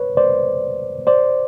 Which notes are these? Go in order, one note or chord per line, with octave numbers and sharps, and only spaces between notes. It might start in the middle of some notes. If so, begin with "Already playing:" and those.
Already playing: B4 C#5
C5 D5
C5 D5